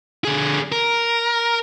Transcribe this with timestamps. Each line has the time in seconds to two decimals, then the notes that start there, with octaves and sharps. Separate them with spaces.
0.25 D3 G#4
0.72 A#4